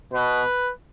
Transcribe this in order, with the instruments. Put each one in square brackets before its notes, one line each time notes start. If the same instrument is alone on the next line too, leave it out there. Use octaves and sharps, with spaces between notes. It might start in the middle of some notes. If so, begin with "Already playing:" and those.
[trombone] B2 [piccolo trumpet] B4